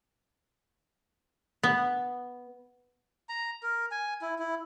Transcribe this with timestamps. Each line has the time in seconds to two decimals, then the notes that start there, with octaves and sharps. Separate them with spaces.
1.63 B3
3.29 A#5
3.63 A#4
3.91 G#5
4.22 E4
4.39 E4